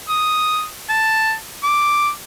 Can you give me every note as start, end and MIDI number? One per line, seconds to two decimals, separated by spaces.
0.09 0.66 87
0.89 1.34 81
1.63 2.10 86